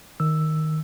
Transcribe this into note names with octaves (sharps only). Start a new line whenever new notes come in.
D#3 E6